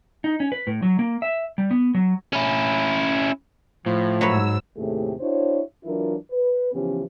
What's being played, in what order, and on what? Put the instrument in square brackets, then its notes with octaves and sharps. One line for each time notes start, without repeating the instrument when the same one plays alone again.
[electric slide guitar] D#4
C#4
B4
A2
F#3
A#3
E5
G3
B3
F#3
[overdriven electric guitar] C#4 E4
[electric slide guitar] A2 [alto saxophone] F3
[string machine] G#2 E6 [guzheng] F#3 B4 C#5
[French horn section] D#2 A2 C3 A3 G4 G#4
D4 E4 F#4 C5 C#5
E3 F#3 D4 E4 F4 A#4
B4
C#3 E3 F3 B3 C#4 G4